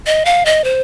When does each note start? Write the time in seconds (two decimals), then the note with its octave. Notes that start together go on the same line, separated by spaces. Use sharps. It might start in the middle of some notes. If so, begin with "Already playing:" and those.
0.06 D#5
0.25 F5
0.46 D#5
0.64 C5